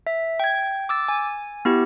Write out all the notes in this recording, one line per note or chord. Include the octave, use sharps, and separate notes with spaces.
E5
G5 G#6
D6 E6 A6
G#5
B3 E4 G4